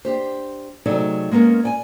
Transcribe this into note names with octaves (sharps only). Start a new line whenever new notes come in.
D4 G4 C5
C3 F#3 A3 D#4 G#4 D5
G#3 A#3 B3 C#4 A#4
D5 G5 G#5